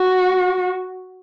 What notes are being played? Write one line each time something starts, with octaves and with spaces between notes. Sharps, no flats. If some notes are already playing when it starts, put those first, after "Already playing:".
Already playing: F#4